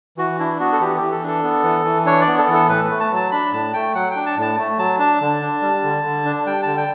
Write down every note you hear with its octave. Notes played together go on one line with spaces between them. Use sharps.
E3 F#4
D4 E4
B3 F#4
A4
E3 G4
E3 G4
A4
D4 A4
B3
E3
E3
D4 C#5
D5
B3
A4
E3
A4
A2 B4
B4
A3
A5
F#3 A5
D4 B5
A2 A5
A3 G5
F#3 F#5
D4 G5
A5
A2 A5
A3
F#3 A5
D4 A5
D3
D4
G3
D3
D3
D4
G3 G5
D3 A5
G5